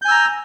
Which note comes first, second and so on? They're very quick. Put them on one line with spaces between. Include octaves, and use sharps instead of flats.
G6 G#5 E6 A#5